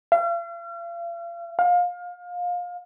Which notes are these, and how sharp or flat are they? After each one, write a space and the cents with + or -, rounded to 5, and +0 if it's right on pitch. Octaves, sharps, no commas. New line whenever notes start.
F5 -40
F5 +25